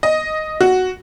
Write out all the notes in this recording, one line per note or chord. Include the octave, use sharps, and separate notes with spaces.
D#5
F#4